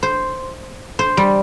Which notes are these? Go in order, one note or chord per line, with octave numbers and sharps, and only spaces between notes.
C5
C5
G3